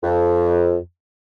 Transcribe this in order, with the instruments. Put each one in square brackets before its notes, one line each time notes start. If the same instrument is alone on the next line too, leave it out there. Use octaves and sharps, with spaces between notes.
[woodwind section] F2